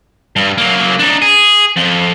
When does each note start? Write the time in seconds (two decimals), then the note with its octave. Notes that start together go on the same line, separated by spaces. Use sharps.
0.36 G2
0.58 F#3 A#3
0.99 D4 D#4
1.22 G#4
1.76 F2